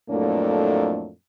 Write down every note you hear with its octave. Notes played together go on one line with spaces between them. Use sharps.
F2 A2 F#3 A3 A#3 D4